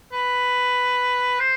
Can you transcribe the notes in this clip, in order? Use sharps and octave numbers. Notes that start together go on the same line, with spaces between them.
B4
C5